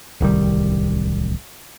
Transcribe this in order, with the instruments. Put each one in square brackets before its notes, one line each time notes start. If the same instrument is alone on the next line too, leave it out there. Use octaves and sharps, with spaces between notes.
[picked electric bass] D1 C2 D#3 G3